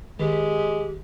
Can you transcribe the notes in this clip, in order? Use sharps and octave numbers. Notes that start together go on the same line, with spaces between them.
D#3 G#3 G4